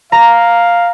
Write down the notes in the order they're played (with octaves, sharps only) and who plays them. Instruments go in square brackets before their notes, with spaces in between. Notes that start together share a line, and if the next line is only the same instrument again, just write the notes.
[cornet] F5 [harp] A#5